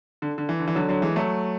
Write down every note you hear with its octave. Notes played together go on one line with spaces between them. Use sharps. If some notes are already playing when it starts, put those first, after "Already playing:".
D3
D3
E3
D3
E3
D3 F#3
D3 F#3
E3 G#3
F#3 A3